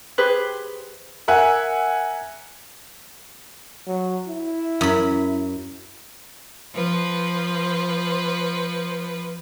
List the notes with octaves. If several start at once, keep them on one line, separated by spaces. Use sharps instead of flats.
G4 G#4 B4 C5
A#4 E5 F#5 G#5
F#3
E4
F#2 B5
F3 B4 C5